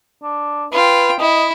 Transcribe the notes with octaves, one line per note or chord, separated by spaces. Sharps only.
D4
F4 B4 G5
E4 D#5